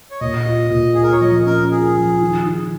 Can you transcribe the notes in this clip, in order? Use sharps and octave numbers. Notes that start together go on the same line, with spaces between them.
C#5
A#2 D#5
F4
A#2
F4 G#4
A#4
C#5
F3 D#5
C#4 A#4
F4 G#4
F3
D#3
D#3